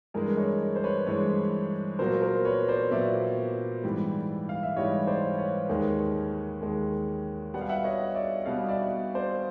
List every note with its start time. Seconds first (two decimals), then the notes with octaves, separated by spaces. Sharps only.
0.14 G2 E3 G#3 G#4 A#4
0.37 C#5 D#5
0.76 C5
0.84 B4 C#5
1.07 G2 E3 G#3 B4 C#5
1.99 A#2 F#3 B3 A#4 C5
2.22 A#4 C5
2.45 B4 C#5
2.68 C5 D5
2.91 A#2 F#3 B3 D5 E5
3.84 G#2 E3 G3
4.49 F5
4.63 E5
4.76 G#2 E3 G3 C#5 D#5
5.07 C5 D5
5.38 B4 C#5
5.69 D#2 D#3 G#3
6.62 D#2 D#3 G#3
7.54 B2 G3 B3 F#5
7.61 F5
7.69 E5 F#5
7.84 C#5 D#5
8.15 D5 E5
8.46 B2 G3 B3 D#5 F5
8.69 D5 E5
9.15 C5 D5